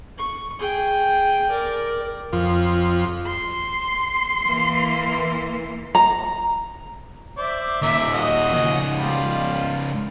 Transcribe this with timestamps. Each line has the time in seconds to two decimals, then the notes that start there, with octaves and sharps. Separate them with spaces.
0.18 C#6
0.59 G#4 G5
1.51 A#4 D5
2.33 F2
3.26 C6
4.44 E3 A#3
5.95 A#5
7.37 C5 D5 E5
7.82 D#2 A#2 A#4 E5 D6
8.13 F#4 D#5
8.53 C#2 G#2
8.95 G3 F4